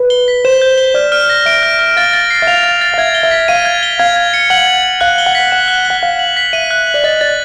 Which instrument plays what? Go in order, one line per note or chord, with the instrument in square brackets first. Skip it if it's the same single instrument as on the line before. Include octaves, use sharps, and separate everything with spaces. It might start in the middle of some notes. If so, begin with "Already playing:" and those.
Already playing: [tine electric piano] B4
[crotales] G7
B6
[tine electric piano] C5 [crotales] E7
[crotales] G6
G7
[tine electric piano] D5 [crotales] F6
[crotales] F6
A#6
[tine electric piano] E5 [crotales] D7
[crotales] F6
F6
[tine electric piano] F5 [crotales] A6
[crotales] A6
C7
[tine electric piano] E5
[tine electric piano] F5 [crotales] F7
[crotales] A6
A6
[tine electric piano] F5
[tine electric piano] E5 [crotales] G#6
[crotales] G7
[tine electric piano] E5
[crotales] B6
[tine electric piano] F5 [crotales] D#7
[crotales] G#6
G7
[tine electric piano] F5 [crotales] G#6
[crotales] G#6
C#7
[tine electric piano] F#5 [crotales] F#7
[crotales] G#6
G#6
[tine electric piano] F5 [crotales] F#6
[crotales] G7
[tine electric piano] F#5
[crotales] B6
[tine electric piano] F#5 [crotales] E7
[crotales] F#6
G7
[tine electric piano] F#5
[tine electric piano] F5 [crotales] F#6
[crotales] F#7
B6
[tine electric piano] E5 [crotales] D#7
[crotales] F#6
F#7
[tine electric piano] D5
[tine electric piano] D#5 [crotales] A6
[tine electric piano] D5 [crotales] A6